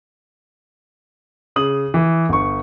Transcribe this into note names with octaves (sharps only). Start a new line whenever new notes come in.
C#3 D#6 F#7
E3
G1 C#6